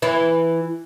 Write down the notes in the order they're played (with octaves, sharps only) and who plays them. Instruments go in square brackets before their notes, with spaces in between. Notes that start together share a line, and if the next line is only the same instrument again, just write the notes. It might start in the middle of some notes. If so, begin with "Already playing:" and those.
[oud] E3 E4